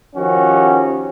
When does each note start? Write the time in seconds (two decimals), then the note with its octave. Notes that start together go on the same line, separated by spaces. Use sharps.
0.15 D#3 F3 C#4 F#4 G4